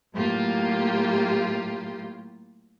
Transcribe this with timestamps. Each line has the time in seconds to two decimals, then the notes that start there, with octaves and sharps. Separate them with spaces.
0.14 A2 F#3 A#3 F4 G4